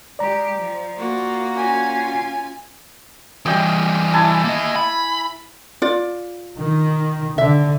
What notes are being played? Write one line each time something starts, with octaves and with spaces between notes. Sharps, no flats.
G#3 G4 D5 A#5
F3
A#3 F4 F#4
C#4 F4 G#5
E3 G3 D#5 G5 D#6
E4 G#5 A5
A#3 D#5
B5
F4 D5
D#3
D3 E5